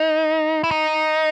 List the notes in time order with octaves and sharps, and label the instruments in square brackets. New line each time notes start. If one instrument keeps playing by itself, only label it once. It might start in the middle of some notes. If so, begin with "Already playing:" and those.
Already playing: [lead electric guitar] D#4
E4
D#4